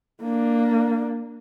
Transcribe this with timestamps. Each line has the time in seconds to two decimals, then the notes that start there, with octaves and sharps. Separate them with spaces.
0.22 A#3 D4